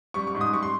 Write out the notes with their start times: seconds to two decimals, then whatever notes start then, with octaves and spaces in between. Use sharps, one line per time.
0.14 G3 C#6
0.27 C#6
0.35 G#2
0.41 D#6
0.53 G3 C#6
0.63 C6